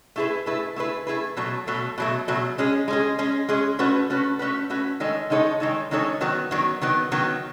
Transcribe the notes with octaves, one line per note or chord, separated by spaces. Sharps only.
A3 E4 G#4 B4
A3 E4 G#4 B4
A3 E4 G#4 B4
A3 E4 G#4 B4
B2 F#3 A3
B2 F#3 A3
B2 F#3 A3
B2 F#3 A3
G#3 C#4 G#4
G#3 C#4 G#4
G#3 C#4 G#4
G#3 C#4 G#4
A3 C#4 F#4 B4
A3 C#4 F#4 B4
A3 C#4 F#4 B4
A3 C#4 F#4 B4
D#3 G#3 D#4 A4 C#5
D#3 G#3 D#4 A4 C#5
D#3 G#3 D#4 A4 C#5
D#3 G#3 D#4 A4 C#5
D#3 F#3 B3
D#3 F#3 B3
D#3 F#3 B3
D#3 F#3 B3